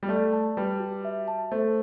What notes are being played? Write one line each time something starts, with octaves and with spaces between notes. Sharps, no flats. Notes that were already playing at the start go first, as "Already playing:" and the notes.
G3
A3 D5
A5
G3 B4
F#4
E5
A5
A3 C5